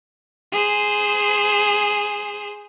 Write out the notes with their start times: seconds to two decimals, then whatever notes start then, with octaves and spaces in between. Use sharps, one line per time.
0.52 G#4 C5